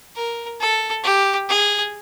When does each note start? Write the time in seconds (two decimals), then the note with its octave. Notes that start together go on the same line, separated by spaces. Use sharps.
0.16 A#4
0.60 A4
1.04 G4
1.49 G#4